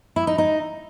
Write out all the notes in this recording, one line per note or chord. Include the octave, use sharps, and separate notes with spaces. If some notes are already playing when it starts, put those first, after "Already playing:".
E4
D#4
D#4